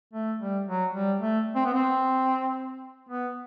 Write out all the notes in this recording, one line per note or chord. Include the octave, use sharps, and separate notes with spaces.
A3
G3
F#3
G3
A3
C4
B3
C4
B3